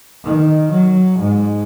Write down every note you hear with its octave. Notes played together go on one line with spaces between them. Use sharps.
D#3
F#3
G#2